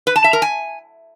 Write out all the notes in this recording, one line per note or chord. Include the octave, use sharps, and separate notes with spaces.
B4
A5
E5
A#4
G#5